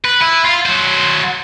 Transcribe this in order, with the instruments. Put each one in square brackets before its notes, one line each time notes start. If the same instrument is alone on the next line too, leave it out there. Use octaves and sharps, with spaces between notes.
[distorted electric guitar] B4
E4
F4
F#3 C5